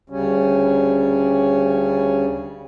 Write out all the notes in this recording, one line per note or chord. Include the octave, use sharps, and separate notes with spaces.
D2 C#3 G3 C#4